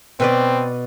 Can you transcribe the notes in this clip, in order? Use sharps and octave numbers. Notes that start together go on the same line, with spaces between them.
B2 C4 B4 D5